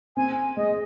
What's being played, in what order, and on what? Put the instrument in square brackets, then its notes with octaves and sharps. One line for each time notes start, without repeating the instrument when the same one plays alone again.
[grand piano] C4 [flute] G#5
[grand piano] G#3 [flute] D#5